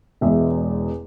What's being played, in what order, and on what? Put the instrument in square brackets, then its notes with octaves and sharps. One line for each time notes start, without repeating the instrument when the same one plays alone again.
[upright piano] E1 E2 B2 G#3 B3 E5